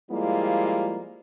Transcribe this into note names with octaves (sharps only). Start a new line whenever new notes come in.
F3 G3 G#3 A#3 E4 F4